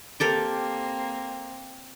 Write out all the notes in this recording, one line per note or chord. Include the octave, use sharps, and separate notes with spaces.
A#3 C4 G4 A4 A#4